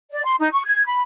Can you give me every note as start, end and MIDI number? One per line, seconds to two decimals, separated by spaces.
0.11 0.24 74
0.24 0.35 84
0.40 0.48 63
0.53 0.61 85
0.65 0.83 92
0.86 1.00 83